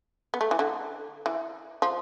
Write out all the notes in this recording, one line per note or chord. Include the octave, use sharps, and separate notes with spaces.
B3
A3
E3
D3
E3
F3